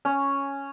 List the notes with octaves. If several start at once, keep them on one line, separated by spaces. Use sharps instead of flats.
C#4